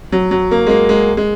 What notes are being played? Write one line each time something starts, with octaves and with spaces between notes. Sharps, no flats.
F#3
F#3
A#3
G#3
A#3
G#3
G#3